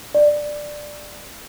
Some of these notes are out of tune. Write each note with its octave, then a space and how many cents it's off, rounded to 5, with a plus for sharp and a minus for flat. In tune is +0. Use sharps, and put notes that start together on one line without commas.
D5 +10